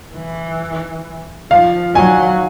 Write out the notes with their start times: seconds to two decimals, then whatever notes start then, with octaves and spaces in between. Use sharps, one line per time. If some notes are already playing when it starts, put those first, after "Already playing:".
0.16 E3
1.51 F3 F5
1.95 F#3 G#5